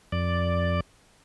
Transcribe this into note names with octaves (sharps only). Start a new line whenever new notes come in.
F2 D5